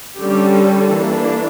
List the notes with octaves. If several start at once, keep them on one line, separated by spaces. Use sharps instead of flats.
D3 G3 C#4 G4
A4
E3 A#3 D4